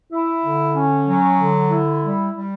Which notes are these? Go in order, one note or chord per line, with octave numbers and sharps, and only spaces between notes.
E4
D3
C#4
F#3
D3
E4
G3
G3